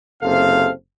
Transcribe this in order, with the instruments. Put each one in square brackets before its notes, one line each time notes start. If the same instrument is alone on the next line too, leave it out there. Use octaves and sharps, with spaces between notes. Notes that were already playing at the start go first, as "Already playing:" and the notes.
[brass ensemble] F#1 C3 C4 A4 F5